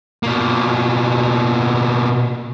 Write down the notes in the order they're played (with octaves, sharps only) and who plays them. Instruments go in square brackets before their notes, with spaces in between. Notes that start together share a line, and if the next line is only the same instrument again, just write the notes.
[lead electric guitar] B2 A#3